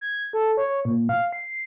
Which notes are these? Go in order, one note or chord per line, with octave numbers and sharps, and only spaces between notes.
G#6
A4
C#5
A#2
F5
C7